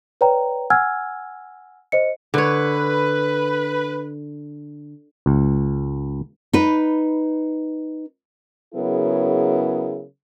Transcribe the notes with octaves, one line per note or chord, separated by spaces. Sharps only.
B4 C#5 D5 G5 A#5
F#5 G#5 E6 F6 G#6
C5 D#5 C#7
D3 B4 C#5
C#2
D#4 B4
C#3 F#3 B3 E4 G#4 A#4